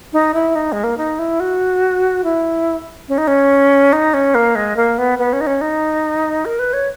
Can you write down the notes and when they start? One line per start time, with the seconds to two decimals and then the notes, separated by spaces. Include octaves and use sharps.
0.13 D#4
0.34 E4
0.55 D#4
0.72 G#3
0.84 A#3
0.98 D#4
1.19 E4
1.40 F#4
2.24 E4
3.09 C#4
3.18 D#4
3.28 C#4
3.93 D#4
4.14 C#4
4.35 A#3
4.55 G#3
4.76 A#3
4.98 B3
5.19 B3
5.33 C#4
5.41 D#4
5.47 C#4
5.61 D#4
6.45 A#4
6.59 B4
6.73 C#5